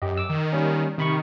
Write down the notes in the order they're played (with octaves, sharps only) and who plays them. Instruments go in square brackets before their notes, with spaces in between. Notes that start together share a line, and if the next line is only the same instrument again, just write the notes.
[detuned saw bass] F#2 [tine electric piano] G4 D#5
[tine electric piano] D6 E6
[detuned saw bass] D#3
[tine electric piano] G3 A#3 C#4
[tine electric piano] C3 B5 C#6 [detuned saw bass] D#3